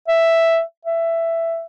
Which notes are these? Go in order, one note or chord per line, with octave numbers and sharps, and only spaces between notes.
E5
E5